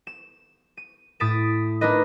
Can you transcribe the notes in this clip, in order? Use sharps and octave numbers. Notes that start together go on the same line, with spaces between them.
E7
D#7
A2 D#6 A6 B6 D7 E7
D4 D#4 A#4 B4 D#5